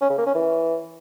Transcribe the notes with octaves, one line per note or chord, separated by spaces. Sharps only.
C#4
C#3
A#3
C#4
E3